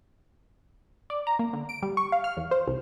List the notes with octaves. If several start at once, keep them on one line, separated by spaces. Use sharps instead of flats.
D5
A#5
A#3
D3
D7
G3
C#6
F5
F6
E2
C5
C2